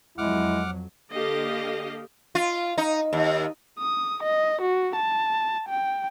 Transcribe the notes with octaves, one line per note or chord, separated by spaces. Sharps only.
F2 F#3 G#3 E4 F#5 D6 F6
D3 A#3 G4 A4 D#5 F5
F4
D#4
D#2
D#6
D#5
F#4
A5
G5